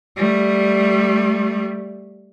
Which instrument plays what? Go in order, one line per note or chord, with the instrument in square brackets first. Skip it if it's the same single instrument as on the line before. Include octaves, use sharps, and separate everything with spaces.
[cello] G3 A3